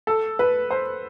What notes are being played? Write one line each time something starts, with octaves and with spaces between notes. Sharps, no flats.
A4
B4
C5